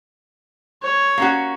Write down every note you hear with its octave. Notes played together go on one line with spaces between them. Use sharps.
C#5
A#3 C#4 F#4